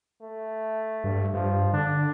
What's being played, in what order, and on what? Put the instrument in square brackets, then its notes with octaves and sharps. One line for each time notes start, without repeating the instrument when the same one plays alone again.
[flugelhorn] A3
[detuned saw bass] G2
[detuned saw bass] G2 [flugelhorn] F3
[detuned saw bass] D3 [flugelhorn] D4